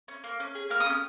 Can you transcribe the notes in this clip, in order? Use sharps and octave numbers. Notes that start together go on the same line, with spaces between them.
C#4
A#3
C#4
G#4
A#3 F6
D#6
C#4 F6